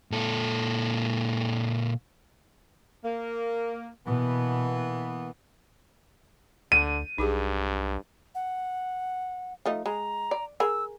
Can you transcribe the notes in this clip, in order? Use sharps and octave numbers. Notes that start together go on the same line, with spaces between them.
A#2 A4
A#3
B2 E3 A#3 B3
D2 D3 D#7
B1 G2 D#4 G4 G#4
F#5
F3 A3 D#4
G#3 A#5
D5
G#4 A#4 E6